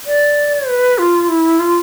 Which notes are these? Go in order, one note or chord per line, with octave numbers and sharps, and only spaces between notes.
D5
B4
F4
E4
F4